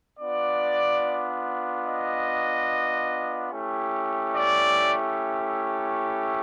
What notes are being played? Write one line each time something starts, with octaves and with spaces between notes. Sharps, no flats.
B3 D4 F4 D5
D#5
A3 C#4 E4 G4
D5